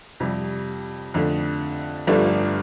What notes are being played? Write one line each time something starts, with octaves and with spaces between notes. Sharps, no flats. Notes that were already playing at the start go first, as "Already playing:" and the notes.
F2 C3 G3
F2 D3 A3
G1 G2 F3 A3 D4